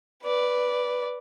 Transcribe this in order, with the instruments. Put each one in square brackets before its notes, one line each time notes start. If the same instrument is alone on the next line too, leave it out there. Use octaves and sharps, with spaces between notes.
[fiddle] B4 D5